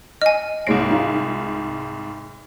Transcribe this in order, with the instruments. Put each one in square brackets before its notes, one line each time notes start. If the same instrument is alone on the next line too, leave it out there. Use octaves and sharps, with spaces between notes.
[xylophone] D#5 G#5 [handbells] F6
[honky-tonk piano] C2 G#2 D7 [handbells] C#5 A#6 C7
[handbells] D#4 F4 F5